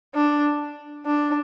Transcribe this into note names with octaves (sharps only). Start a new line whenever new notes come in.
D4
D4